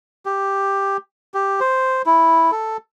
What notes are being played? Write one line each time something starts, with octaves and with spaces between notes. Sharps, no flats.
G4
G4
C5
E4
A4